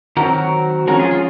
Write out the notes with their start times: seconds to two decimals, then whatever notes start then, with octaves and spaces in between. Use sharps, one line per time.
0.17 D#3 F#3 C4 F#4 A#4
0.87 F3 G#3 C#4 F#4 A#4
0.99 F4 G#4
1.11 F4